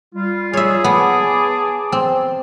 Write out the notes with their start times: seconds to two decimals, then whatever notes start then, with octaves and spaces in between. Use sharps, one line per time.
0.14 G3 F4
0.53 G#4 C#5 E5
0.84 B3 G#5 A5 D6
1.92 C4